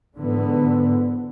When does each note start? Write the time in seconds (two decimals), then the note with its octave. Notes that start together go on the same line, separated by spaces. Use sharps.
0.17 G#2 D3 E3 B3